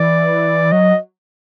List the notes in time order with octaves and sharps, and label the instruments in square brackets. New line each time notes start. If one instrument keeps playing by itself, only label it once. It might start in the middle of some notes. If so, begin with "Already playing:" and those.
Already playing: [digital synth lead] E3 [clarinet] D5
[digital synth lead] F#3 [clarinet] D#5